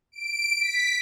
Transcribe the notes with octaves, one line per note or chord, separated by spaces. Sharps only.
D7
B6